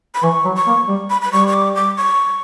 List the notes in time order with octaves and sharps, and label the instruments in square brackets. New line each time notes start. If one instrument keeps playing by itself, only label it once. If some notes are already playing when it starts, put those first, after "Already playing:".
[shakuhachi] B5
[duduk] E3 [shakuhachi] C#6
[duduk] F#3
[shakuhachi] C#6
[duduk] A#3
G3
[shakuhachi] B5
B5
[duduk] G3 [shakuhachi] C#6
[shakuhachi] C#6
D6
D6
C#6